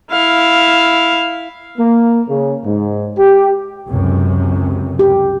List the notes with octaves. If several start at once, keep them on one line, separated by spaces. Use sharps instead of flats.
E4 F5
A#3
C#3
G#2
G4
C#2 F#2 C3
G4